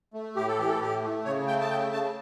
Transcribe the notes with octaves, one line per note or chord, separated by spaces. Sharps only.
A3
A2 G4
A4
E3 G4
A4
A2 G4
A3
C#3 C#5
A3 G5
A5
C#3 G5
C#3 A5